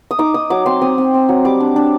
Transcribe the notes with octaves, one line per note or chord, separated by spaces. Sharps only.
D#6
D#4 D6
D#4 D#6
F#3 D6
C4 C6
C4 D#6
C4
C4
F#3
G3 D6
D4
D4